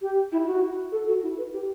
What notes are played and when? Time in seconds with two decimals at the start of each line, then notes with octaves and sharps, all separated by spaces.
0.02 G4
0.32 E4
0.46 F#4
0.92 A4
1.08 F#4
1.23 E4
1.38 B4
1.53 G4